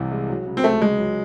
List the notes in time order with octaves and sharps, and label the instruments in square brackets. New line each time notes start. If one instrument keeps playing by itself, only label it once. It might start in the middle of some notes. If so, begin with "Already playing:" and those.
Already playing: [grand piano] C2 C3 E3
G#3
F#3
C#3
[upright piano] C4
[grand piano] C#2 [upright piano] A3
[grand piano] C#2 [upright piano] G#3
[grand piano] F#3